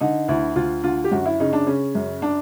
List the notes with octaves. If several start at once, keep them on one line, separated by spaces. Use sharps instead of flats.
D3 D#4
D2 E4
D2 F4
D3 F4
G4
F#2 F#4
E4
C#3 D#4
D4
C#3 C#4
F#2
D4